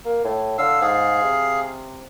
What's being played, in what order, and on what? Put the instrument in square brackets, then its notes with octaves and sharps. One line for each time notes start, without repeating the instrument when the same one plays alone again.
[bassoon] A#3
A2
[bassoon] D3 [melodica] F5 E6
[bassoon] G#2 [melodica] G#4 F5
[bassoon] C3